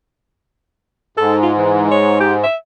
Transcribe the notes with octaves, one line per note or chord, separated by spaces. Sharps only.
G#2 A4
F4
E3
C#5
G4
E5